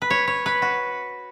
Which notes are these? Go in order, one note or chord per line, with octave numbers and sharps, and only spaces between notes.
B4
C#5
C#5
B4
F#4